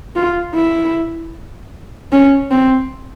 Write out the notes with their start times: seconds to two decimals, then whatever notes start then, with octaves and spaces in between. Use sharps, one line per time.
0.16 F4
0.55 E4
2.12 C#4
2.51 C4